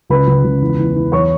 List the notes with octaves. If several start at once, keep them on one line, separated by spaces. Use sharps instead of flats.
C#2 B4 B5
C#2
C#2
E2
E2
E3
E2 C#5 C#6